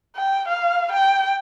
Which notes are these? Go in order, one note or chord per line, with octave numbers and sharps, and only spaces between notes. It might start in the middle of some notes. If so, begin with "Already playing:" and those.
G5
F5
G5